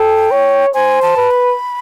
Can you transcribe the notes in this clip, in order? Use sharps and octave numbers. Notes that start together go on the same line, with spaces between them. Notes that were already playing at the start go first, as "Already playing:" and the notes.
Already playing: A4 G5
C#5
C5 G#5
A5
B4
B5